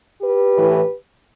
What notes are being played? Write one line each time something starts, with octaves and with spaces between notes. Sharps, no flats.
G4 B4
A2 E3